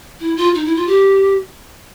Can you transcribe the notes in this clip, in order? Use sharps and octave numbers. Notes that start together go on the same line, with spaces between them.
E4
F4
D#4
E4
F4
G4